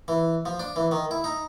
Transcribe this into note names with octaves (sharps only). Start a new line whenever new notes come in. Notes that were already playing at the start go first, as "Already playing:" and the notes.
E3
F3
D4
E3
D#3
E4
D#4